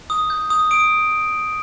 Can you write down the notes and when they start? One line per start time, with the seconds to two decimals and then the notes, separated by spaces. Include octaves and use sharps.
0.10 D#6
0.30 G6
0.50 D#6
0.71 D#6 D7